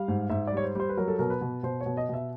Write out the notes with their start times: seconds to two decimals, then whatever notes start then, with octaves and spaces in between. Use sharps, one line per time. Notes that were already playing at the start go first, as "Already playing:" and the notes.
Already playing: G3 F5
0.08 G#2
0.30 G#2 E5
0.47 D5
0.52 G3 C#5
0.64 C5
0.75 G3 C5
0.89 B4
0.97 F#3 A#4
1.08 A4
1.19 B2 A#4
1.30 B4
1.41 B2
1.63 B2 C5
1.81 C#5
1.86 B2
1.97 D#5
2.09 B2 E5